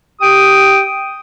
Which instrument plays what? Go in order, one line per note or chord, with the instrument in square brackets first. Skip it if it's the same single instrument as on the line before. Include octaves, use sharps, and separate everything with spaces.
[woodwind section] G4 G5 D#6